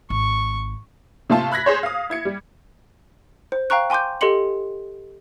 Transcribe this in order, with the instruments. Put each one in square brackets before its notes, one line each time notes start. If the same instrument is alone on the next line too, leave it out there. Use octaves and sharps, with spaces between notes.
[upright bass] G#1 [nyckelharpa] C#6
[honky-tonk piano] C3 A3 F4 A5
B5 F#6 G#6 A#6 B6
G#4 C5 C#5
F5 D#6
E4 G#6 C#7
G3
[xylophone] C5
F5 G5 A#5 C#6 F#6
G5 G#5 C6 D6 G6
G4 A4 D#5 C6 C#7 F#7